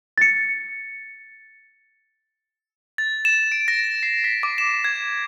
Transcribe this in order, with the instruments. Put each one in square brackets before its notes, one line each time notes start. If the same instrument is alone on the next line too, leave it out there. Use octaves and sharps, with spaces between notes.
[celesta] A6 C#7
[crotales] A6
E7
D7
A#6
C7
B6
D6
E7
G#6